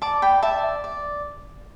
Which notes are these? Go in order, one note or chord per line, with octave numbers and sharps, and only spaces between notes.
D5 A5 D6
G5 B5
D5 E5 A5
D5